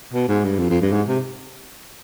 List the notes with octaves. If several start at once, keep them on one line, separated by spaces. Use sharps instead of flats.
B2
G#2
G2
F2
F2
G2
G#2
C3